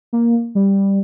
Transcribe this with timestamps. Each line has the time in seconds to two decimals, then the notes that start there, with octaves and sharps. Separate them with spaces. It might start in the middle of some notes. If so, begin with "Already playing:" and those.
0.13 A#3
0.55 G3